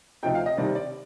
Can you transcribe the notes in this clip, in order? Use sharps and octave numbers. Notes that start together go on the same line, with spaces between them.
D2 C3 F3 A3 D#4 G5
F5
D#5
C2 C3 D#3 G3 D5
D5